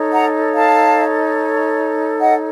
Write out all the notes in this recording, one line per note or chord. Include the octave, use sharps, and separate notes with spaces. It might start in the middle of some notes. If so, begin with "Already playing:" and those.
Already playing: D#4 A4 C#5
F#5 A#5
F5 A5
D#5 F#5